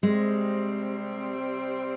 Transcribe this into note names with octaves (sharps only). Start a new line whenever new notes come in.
C3 G3 G#3 C4